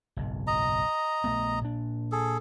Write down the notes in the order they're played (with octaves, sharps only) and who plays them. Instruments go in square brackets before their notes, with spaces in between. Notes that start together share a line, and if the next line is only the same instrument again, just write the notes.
[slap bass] F#1 B1 G#2
[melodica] D#5 A#5
[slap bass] A#1 A3 B3
A#2 D4
[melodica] G#4 A4